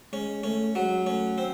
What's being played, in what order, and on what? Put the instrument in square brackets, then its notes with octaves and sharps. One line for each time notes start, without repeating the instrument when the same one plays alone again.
[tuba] G#3 [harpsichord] C#4
[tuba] A3 [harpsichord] C#4
[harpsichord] F#3 [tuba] G#3
[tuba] A3 [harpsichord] C#4
[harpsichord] C4